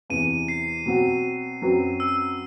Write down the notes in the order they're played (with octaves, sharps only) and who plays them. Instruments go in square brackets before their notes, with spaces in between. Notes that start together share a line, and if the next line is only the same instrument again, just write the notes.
[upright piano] E2 C3 E3 [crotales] D#7
[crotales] C7
[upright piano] B2 F#3 C4 F#4
F#2 F#3 C4 F#4 B4
[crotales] E6